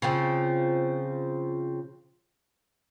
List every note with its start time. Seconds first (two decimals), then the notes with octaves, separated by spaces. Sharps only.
0.02 C#3 F3 C4